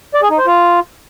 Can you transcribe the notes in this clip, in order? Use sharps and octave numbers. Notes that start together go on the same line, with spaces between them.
D5
G#4
D#4
C5
F4